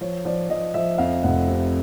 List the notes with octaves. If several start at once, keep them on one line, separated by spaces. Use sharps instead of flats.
F3 C#5
F3 D5
F3 D#5
F3 E5
F2 F5
F1 F#5
C3